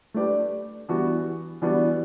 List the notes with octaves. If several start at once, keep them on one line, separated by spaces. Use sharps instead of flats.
A3 D4 G4 B4 D5
E3 G3 B3 D4 F#4
E3 G3 B3 D4 F#4